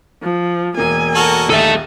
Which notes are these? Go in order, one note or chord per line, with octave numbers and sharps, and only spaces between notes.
F3
E1 A#3 G#5
F#4 A4 A#4
D#1 A#1 D#4 A4 E5 D#7